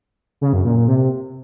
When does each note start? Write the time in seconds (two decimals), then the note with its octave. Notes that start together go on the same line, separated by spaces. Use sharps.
0.41 C#3
0.53 F#2
0.65 A#2
0.76 A#2
0.88 C3